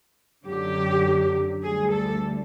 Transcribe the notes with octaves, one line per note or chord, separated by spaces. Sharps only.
F#2 D3 F#3 G4
D2 D3 G3 G#4
A4